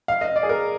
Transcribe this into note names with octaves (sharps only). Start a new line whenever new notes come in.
F5
D#5
D5
G#4
A#4